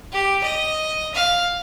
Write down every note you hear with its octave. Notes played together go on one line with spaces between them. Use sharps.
G4
D#5
F5